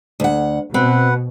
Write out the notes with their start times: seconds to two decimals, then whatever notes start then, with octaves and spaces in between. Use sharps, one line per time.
0.20 D2 F#5
0.74 B2 C4 B4 F#5